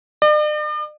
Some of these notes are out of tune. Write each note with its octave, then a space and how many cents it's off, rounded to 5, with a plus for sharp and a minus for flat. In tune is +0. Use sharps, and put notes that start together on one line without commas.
D5 +45